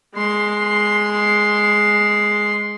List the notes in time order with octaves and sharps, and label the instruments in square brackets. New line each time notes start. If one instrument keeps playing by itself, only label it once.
[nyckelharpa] G#3 C6